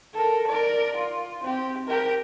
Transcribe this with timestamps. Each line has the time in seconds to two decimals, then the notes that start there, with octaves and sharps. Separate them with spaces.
0.14 A4 A#4
0.48 A#4 D5
0.97 F4
1.43 C4 G4
1.87 G4 A#4